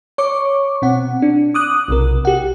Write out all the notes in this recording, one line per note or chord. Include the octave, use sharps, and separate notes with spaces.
C#5 C#6 D6
B2 C4 F#5
D4
D6 D#6 F#6
B1 C3 A#4
G4 F#5